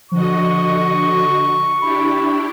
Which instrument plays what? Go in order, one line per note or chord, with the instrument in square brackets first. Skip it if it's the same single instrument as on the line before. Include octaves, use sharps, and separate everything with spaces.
[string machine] D3 F#4 D#5 [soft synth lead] F3 [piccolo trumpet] C#6
[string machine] D4 E4 G4 [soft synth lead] B5